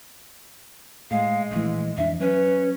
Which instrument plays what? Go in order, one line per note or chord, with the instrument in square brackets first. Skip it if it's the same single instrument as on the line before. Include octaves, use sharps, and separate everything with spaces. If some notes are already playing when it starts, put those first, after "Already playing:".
[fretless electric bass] A2 [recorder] G#3 [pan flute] F5
[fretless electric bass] A#1 E3 [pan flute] A3
[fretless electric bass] F2 E3 D4 [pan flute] E5
[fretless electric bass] F#3 [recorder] C#4 [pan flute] B4